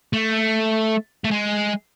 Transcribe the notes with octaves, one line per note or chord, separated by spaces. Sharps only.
A3
A3
G#3